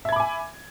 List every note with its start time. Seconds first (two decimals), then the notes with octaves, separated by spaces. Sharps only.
0.05 E5
0.09 G#6
0.12 B5
0.16 D6
0.20 G#5